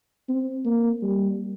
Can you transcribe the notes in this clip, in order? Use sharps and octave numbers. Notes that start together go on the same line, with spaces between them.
C4
A#3
G3